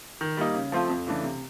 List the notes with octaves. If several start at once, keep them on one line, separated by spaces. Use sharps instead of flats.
D#3
G3 A#3 D#4
C#3
F3 A3 C4 F4
F2
C#3 E3 A3 D4
C3